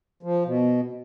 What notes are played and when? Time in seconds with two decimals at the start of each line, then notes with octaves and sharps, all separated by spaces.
0.23 F3
0.46 B2